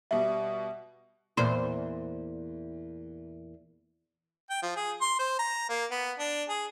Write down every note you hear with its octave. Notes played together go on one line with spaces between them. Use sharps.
B2 G3 E5
E2 A#2 C5
G5
F3
G#4
C6
C5
A#5
A#3
B3
D4
G#4